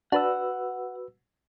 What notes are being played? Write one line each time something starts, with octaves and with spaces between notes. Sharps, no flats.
D4 F#4 B4 F#5 E6